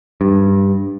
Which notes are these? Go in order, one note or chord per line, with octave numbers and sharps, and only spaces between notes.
G2